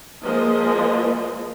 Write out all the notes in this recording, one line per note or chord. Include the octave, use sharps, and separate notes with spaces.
F3 G#3 A#3 D#5